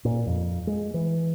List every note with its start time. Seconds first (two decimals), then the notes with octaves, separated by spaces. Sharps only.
0.05 A#2
0.27 F2
0.67 G#3
0.94 E3